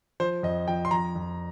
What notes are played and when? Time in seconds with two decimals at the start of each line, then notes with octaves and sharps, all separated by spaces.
0.20 F3 C5
0.43 F2 D#5
0.68 F3 G5
0.85 C6
0.91 F2 A#5
1.15 F2